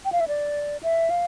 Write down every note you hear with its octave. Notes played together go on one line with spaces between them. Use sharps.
G5
F5
E5
D5
E5
F5